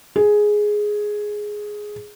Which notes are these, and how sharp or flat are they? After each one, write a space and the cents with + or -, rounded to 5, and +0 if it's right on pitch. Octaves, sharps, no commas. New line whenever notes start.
G#4 +5